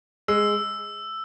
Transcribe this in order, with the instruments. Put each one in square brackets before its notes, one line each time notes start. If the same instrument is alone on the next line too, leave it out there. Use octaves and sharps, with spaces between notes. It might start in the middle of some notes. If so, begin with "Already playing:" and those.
[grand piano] G#3 [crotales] E6